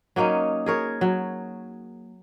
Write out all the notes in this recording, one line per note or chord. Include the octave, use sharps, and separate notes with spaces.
F#3 A#3 C#4 D#4
G#4 A#4 C#5
F#3